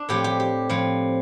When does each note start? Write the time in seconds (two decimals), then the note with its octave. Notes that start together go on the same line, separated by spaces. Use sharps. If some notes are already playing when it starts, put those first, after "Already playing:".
Already playing: D4
0.09 A2 F3 C4 G4
0.24 G4
0.40 G4
0.69 A2 F3 C4